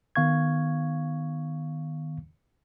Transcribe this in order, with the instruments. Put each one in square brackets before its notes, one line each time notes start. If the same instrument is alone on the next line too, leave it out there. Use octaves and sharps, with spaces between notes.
[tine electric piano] D#3 B3 F5 C#6 G#6